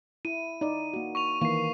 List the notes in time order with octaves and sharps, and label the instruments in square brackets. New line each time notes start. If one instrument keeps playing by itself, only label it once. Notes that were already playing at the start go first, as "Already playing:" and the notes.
[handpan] E4 [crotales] D#7
[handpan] D#4 D5
A#3 F#4
[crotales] C#6 D#7 F7
[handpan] D#3 E3 A#3 [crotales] C#6 C7